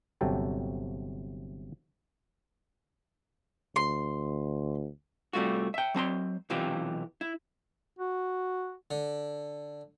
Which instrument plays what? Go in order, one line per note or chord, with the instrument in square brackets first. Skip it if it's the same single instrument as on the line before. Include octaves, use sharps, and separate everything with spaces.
[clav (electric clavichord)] G1 C3 F#3 A4 G5 A5
[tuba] D2 [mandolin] C6
[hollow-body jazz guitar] C3 G3 A3 F4 F#4
E5 G5
F#3 C4 A#5 C6
B1 C3 E3 F4 G4
E4
[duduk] F#4
[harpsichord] D3